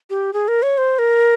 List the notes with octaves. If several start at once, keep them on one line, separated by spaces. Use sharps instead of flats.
G4
G#4
A#4
C#5
C5
A#4